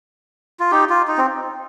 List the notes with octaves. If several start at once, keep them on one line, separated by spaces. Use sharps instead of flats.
F4
D#4 G4
F4
D#4
C4